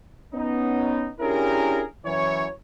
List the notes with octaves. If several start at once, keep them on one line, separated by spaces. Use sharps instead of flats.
B3 C#4 D#4
C#4 D4 E4 G4 G#4 A#4
F#2 E3 C#5